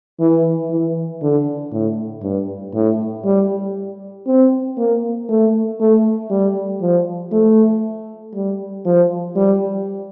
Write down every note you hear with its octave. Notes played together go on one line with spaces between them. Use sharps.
E3
E3
D3
A2
G2
A2
G3
C4
A#3
A3
A3
G3
F3
A3
G3
F3
G3